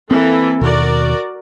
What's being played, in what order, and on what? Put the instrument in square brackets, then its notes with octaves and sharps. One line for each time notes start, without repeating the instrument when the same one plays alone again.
[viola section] E3 A#3 A4 [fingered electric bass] C4
[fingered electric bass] D#2 B2 [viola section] F#4 A#4 D5